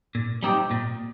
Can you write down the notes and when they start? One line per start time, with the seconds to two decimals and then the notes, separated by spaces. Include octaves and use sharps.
0.15 A#2
0.43 G3 C4 D#4 G4
0.71 A#2